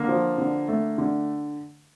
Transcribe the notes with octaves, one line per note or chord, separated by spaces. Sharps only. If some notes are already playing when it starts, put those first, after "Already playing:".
Already playing: D3 A#3
F3
D3
A3
D3